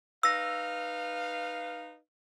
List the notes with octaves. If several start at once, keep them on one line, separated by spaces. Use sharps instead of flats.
D#4 B4 F5 E6 A#6